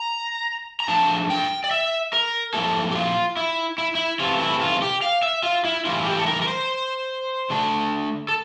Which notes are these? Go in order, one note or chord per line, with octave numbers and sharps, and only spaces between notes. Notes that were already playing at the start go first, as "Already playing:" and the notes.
Already playing: A#5
A#5
F3 A3 D4 A5
G5
D5
E5
A#4
F3 A#3 E4 A4
G4
F4
E4
E4
E4
C3 E3 A3 F4
E4
F4
G4
F5
E5
F4
E4
A2 E3 G3 A#3 E4 F4
G4
A4
A#4
A#4
C5
D3 A3 D4
A4